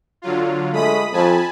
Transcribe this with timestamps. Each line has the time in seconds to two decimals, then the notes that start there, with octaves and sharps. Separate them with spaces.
0.22 D3 F#3 F4
0.73 G#3 A3 B5 D#6 B6
1.12 F2 G#5 A5 B5